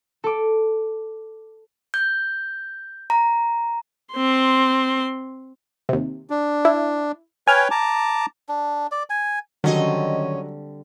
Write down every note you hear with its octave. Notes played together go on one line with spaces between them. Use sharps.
A4 D6
G6
A#5
C4 C6
D#2 C3
D4
E4
B4 C#5 G5 G#5 F6 G#6
A5 A#5 D6
D4
D5
G#5
D3 D#3 F#3 G3 C4 C#4 D#5